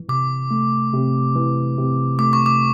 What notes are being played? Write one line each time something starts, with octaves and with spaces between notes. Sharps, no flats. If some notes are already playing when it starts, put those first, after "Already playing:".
Already playing: E3
C3 D6
A3
C3
E3
C3
A3 D6
C#6
D6